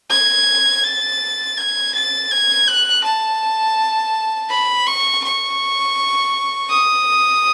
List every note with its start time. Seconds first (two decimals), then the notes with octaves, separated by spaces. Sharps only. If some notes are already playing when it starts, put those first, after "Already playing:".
0.10 G#6
0.83 A6
1.57 G#6
1.94 A6
2.31 G#6
2.67 F#6
3.04 A5
4.50 B5
4.86 C#6
5.24 C#6
6.70 D#6